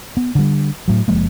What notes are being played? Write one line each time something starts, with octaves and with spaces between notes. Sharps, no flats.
B3
D3 G3
A2 F#3
F#1 F3 G#3 A#3